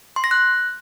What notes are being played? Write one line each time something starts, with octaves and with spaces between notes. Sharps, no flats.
C6
A#6
F#6